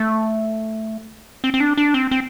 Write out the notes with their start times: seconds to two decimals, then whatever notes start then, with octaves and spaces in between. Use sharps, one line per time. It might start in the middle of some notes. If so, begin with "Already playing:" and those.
Already playing: A3
1.44 C4
1.54 C4
1.60 D4
1.77 D4
1.94 C4
2.11 C4